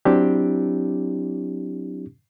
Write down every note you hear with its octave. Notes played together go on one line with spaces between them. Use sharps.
F#3 C4 D4 E4 G4